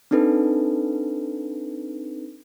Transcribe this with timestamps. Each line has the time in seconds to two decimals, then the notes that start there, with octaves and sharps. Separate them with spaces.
0.11 C4 D4 D#4 A4 B4